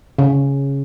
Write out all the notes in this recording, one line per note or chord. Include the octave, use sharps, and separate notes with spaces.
C#3